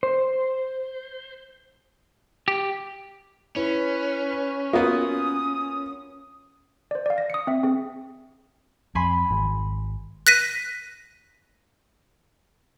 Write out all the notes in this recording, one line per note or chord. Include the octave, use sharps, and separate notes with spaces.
C5
G4
C#4 E4 B4
A#3 B3 F4 F#4 D#6
C5 D5
D5 F5
A#6
D#6 C#7
C4 E5
C4 G#4
F2 G#5 B5 C6
G#1
F#6 A#6 B6 D#7